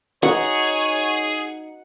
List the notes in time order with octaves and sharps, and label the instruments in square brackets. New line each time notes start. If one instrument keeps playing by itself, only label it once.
[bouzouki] D#4 [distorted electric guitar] G#4 [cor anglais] C#5 [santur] F#5